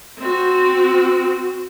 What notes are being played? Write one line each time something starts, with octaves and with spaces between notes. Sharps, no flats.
C4 F#4